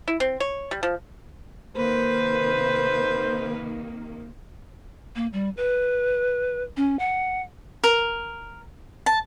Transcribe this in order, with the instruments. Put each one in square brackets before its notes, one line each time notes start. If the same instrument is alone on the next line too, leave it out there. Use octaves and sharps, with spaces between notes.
[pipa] E4
C4
C#5
G3
F3
[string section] C3 D#3 A#3 [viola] B4 [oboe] C5
[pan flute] A#3
G3
B4
C#4
F#5
[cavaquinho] A#4
A5